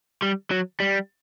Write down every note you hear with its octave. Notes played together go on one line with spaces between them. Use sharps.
G3
F#3
G3